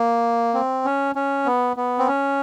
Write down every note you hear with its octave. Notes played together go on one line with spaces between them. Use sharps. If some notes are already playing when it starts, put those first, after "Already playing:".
Already playing: A#3
C4
C#4
C#4
B3
B3
C4
C#4